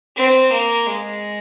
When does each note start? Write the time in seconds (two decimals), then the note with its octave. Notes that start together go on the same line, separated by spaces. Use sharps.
0.16 C4
0.52 A#3
0.87 G#3